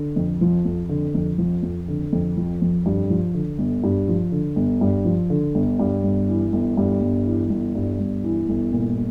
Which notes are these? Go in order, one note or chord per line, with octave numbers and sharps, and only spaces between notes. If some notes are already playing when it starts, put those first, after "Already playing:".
Already playing: D3
F2
F3
F2
D3
F2
F3
F2
D3
F2
F3
F2
G2
F3
D3
G1
G2
F3
D3
G1
G2
F3
D3
G1
G2
G1
E3
G1
G2
G1
E3
G1
G2
G1
E3
G1
A#2